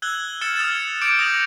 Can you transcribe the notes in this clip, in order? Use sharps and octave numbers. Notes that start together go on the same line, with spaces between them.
E6 F#6 G#6 G7
E6 F6 A6 C#7 E7 G7
D#6 F6 G#6 A6 E7
D6 D#6 G6 C#7 D7
D#6 G6 A#6 D7 D#7 F#7